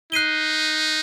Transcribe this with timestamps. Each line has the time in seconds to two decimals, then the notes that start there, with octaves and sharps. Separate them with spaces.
0.12 D#4 F#6 C7 D#7 G7